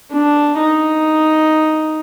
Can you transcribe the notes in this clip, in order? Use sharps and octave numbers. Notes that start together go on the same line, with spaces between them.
D4
D#4